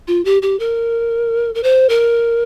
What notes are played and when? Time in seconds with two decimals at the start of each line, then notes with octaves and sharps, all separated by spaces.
0.08 F4
0.25 G4
0.42 G4
0.59 A#4
1.55 A#4
1.63 C5
1.89 A#4